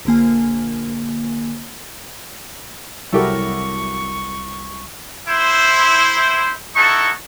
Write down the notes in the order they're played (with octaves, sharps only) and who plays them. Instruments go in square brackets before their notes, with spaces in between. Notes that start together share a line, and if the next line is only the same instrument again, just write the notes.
[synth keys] A#1 D3 A#3 G#5
[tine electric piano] C2 [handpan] F#3 E4 A#4 [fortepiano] F#4 G4 A4 [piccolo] C#6
[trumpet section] E4 C5
D#4 E4 F#4 A4 C#6